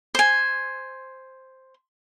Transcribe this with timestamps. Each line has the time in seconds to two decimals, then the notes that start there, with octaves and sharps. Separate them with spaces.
0.15 C5 G#5